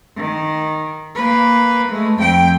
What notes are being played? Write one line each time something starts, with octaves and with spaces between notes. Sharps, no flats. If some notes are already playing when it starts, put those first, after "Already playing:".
D#3
A#3 B4
G#3 A3
F2 G5